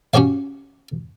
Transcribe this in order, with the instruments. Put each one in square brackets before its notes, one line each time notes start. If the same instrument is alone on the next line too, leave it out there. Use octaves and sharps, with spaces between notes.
[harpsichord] C#4 F#4 G4 C#5 F5